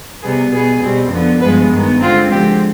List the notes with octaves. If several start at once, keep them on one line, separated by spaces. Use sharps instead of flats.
C3 G3 B3 G#4
B2 B3 G#4
B2 G3 C4
F2 D3 F3 B3
G2 F3 G#3 B3 B4
G2 D#3 B3
D3 G#3 C4 F4
D3 F3 G#3 C4 G4